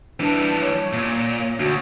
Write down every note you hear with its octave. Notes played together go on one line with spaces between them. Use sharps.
E3 G3 D4
C#5
A#2
D2 F#4